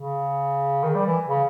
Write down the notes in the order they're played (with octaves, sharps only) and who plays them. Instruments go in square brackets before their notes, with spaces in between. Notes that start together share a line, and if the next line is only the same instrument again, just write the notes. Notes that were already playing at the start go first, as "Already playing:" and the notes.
Already playing: [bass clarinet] C#3
D#3
G3
E3
C#3